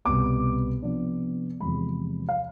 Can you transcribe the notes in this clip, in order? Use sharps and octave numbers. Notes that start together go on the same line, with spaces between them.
C2 B2 B3 D6
C3 F3 B3 D4
E2 C3 F3 G#3 B5
F5